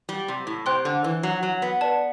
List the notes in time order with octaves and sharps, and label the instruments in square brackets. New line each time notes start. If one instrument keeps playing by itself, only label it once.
[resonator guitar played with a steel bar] G3
C3
A2
[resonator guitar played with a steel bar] C3 [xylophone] C5 G5 C6 F#6
[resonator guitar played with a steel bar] D3
E3
F#3
F#3
B3
[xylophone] B4 D5 A5